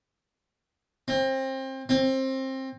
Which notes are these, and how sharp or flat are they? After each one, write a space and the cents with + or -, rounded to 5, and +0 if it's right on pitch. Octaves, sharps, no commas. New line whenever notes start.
C4 +25
C4 +20